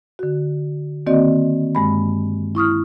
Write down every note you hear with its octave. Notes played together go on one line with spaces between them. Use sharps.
D3 F#4
D#3 A#3 C4 F#4 D5 D#5
G2 G#3 B5
E4 C#6 D#6 F6